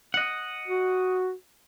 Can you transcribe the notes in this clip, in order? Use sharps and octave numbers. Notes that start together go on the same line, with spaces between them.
D#5 F#5
F#4